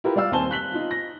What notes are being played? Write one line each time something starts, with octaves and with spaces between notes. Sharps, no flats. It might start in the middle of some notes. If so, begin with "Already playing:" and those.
E4 F4 G4 A#4 B4
G3 D5 F5 E6
D#2 C4 C5 G#5 A5 G7
F#6 B6 F#7 G7
D#4 F4
A#6